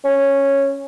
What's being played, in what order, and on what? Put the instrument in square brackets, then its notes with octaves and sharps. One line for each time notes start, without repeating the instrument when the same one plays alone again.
[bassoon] C#4